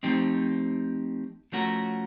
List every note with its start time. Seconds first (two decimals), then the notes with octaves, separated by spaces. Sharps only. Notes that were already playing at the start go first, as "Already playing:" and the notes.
0.03 F3 A3 C4 D#4 G4
1.52 F3 A3 C#4 F#4 A#4